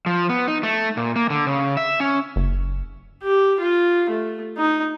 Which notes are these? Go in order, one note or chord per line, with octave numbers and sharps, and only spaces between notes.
F3
B3
D#4
A3
A#2
A#3
D3
C#3
E5
C#4
F#1
G4
F4
A3
D#4